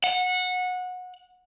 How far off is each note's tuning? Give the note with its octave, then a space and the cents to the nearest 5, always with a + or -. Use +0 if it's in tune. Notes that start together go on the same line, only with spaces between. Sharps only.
F#5 -20